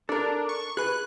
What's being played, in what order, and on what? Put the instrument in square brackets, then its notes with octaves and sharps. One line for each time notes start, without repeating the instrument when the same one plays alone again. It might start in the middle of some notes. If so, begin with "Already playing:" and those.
[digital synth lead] D4 [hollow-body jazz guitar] A4 A#4
[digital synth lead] C#6
[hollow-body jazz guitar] G#4 B4 [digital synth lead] F#6